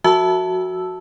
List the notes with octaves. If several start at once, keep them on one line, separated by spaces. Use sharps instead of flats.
F3 F#4 E5 A5 E6